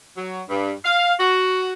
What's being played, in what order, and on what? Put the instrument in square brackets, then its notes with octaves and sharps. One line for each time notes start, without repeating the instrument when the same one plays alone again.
[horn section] F#3
G2
F5
F#4